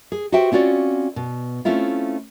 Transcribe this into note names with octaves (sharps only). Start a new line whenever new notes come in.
G#4
F#4 G4 B4 C5 E5 G5
C4 C#4 F4 F#4 D5
B2
A3 C4 C#4 E4 F4